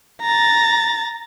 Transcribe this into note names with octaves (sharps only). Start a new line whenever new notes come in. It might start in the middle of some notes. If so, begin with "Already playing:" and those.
A#5 A6